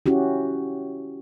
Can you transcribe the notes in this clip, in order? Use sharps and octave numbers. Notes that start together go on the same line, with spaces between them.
C#4 E4 F#4 G4